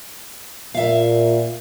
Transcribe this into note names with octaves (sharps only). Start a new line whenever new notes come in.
A#2 E5 F5